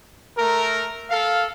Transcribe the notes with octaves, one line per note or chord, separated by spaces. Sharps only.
A3 A#4
A4 F5